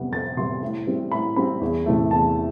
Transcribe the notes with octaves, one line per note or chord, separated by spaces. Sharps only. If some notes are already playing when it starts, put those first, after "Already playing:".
Already playing: F2 C3 G3 B3
F2 A6
C3 G3 B3 C6
A2
G3 C4
A2 B5
G3 C4 B5
E2
C3 E3 A3
E2 A5